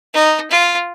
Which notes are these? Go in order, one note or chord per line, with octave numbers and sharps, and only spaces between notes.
D#4
F4